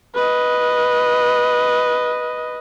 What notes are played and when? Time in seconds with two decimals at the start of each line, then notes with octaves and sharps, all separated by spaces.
0.15 B4 D#5